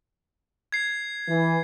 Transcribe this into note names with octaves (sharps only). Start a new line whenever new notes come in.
G#6 C7
E3